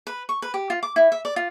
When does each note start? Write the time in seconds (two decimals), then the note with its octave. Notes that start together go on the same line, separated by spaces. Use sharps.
0.07 B4
0.29 C#6
0.42 B4
0.54 G4
0.70 F4
0.83 D6
0.96 E4
1.12 E5
1.25 D5
1.36 F4